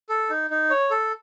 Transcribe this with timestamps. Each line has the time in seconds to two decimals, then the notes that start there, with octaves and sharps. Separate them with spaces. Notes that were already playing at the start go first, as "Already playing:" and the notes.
0.10 A4
0.30 D#4
0.50 D#4
0.70 C#5
0.91 A4